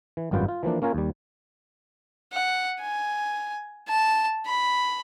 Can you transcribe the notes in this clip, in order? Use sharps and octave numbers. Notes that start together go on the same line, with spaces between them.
E3
G#1 F#2 G3 F4 B4 G5
F4
E3 F3 A#3 D4
A#3 C#4 F4 A#4 G#5
D#2 G3
F#5
G#5
A5
B5